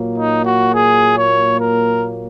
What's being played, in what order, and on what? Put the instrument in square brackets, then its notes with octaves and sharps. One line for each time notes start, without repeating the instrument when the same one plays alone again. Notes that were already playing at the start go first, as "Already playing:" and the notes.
Already playing: [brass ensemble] A#2 F#3 A#3
D#4
F#4
G#4
C#5
A#4